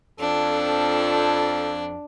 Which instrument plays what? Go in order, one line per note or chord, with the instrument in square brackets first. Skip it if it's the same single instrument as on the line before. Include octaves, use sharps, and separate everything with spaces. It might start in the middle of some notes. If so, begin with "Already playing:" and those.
[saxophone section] F2 [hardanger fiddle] D4 [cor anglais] A4